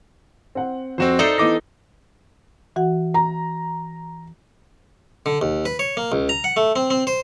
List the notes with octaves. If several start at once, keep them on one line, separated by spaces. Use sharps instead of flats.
C4 F#5
F2 C4 F#4 C5 E7
D#4 A4 C5 D5 E5
E3 B3 D#5 D6 A#6
E3 F#4 F#5
A#5
D3
D#2
B4
C#5
A#3
C#2
A#5
F#5
A3
C4
C4
C5